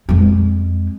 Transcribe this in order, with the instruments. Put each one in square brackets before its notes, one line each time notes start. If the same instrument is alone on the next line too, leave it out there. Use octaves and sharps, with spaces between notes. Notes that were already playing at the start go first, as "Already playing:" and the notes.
[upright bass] F2 G#3